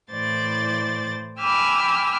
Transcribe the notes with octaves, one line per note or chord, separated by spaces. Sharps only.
A2 E3 C5 D5 A6
G5 G#5 B5 D6 E6 F6